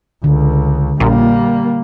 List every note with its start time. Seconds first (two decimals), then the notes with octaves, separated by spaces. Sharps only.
0.24 C#2 D3
1.00 A#1 A#2 G3 A#3